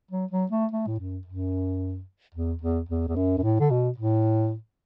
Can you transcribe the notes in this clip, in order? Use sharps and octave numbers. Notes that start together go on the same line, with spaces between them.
F#3
F#3
A3
A3
A2
F#2
F#2
E2
E2
E2
E2
F#2
F#2
A2
D3
B2
A2